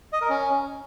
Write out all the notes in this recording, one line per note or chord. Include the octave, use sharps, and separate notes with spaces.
D#5
A#4
C#4